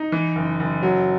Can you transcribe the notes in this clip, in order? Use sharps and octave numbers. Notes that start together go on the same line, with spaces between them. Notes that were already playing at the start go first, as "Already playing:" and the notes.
Already playing: D#4
E3
F#1
F#1
F#3